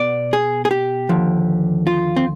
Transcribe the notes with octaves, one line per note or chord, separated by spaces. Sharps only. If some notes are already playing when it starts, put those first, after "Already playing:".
Already playing: B2 B3 D5
G#4
G#4
G4
D#2 D3 F3
F4
C4